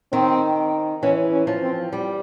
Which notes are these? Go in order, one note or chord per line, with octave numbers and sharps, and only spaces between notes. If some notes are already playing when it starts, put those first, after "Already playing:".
D#3 C4
E3 C#4
C#4
F3
C4
G3